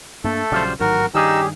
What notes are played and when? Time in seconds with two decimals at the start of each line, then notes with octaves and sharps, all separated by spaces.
0.24 G2 A3 A#3 D4 A4
0.52 A#1 C#3 F#3 G3 F4 C5
0.80 A1 G#2 D#3 F#3 F#4 A#4
1.15 G2 D#3 G3 C#4 D#4 G4 G#4 E6